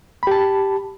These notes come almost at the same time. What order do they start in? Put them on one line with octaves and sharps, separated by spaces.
B5 G4 A5